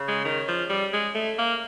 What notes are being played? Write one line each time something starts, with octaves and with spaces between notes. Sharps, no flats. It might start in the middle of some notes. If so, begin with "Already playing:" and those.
Already playing: C#3
G#3
D#3
F3
G3
G#3
A3
A#3